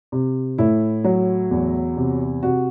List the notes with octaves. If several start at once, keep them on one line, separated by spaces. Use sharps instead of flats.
C3
A2 E4
F#3
E2
C3
C3 F#4